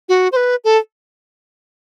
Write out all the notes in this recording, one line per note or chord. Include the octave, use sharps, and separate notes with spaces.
F#4
C5
B4
A4